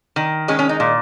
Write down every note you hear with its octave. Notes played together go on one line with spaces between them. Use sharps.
D#3
G#3 C#4
C#4
D#4
A#2